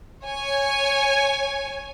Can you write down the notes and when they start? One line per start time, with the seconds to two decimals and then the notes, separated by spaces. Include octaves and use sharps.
0.26 C#5 G#5